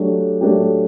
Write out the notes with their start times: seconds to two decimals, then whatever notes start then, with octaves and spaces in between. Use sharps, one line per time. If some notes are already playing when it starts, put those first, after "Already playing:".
Already playing: F#3 A3 D4 G4
0.41 F#3 A3 D4 G4